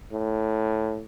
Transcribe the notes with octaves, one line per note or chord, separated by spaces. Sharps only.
A2